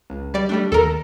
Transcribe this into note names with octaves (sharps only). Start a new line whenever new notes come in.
C#2
G3 D5
G3 A3 D4
D#2 A4 A#4 A#5